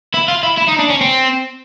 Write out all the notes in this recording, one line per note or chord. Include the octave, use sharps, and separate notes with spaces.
E4
F4
E4
E4
D#4
D4
C#4
C4